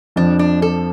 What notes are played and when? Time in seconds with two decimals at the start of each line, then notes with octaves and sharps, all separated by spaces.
0.16 F2 F3 D4
0.39 D4
0.62 A4